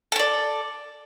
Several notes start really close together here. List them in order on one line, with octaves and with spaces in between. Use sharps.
A4 C#5 D5